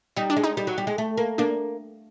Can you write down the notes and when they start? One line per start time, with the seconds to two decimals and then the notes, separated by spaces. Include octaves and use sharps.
0.16 G3 D#4
0.30 D4
0.36 G#3
0.43 D#4
0.57 G3
0.67 F#3
0.78 G3
0.87 G#3
0.98 A3
1.17 A#3
1.38 A#3 D4